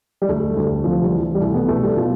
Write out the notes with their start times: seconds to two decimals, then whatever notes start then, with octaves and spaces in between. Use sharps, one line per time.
0.22 G3
0.28 D2 A3
0.56 D2 G3
0.84 C3 F3
1.04 G3
1.13 E3
1.22 A3
1.35 G3
1.41 C2 A3
1.54 B3
1.68 B2 A3
1.83 G3
1.97 B2 F4